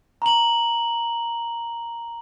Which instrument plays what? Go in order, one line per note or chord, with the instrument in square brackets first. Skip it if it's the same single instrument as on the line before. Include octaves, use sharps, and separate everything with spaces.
[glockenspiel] A#5 F#7